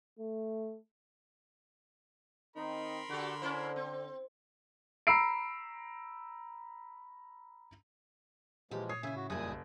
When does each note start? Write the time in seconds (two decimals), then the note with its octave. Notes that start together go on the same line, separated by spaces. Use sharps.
0.19 A3
2.56 D#3 C4 D#4 A#4 B5 C6
3.10 D3 F#4 G4 A4
3.42 C#4 E4 C5
3.76 C4
5.07 A#5 B5 E6 C7 D7
8.71 D#2 A#2 E3 F3 G#3 G4
8.89 C#5 D#6 G#6 C7
9.03 C#3 E4 E5 G#5
9.16 A2 F#4
9.30 F#1 F2 A#2 G3 E4 G#5 D#6
9.51 B1